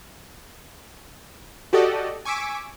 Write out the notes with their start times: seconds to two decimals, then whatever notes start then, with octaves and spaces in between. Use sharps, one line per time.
1.73 F#4 G4 A4 D5 D#5
2.25 G#5 C#6 D6 E6 B6 D7